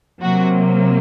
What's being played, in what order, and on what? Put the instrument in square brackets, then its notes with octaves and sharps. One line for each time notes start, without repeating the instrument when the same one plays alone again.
[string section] C3 F#3 A#3 F#4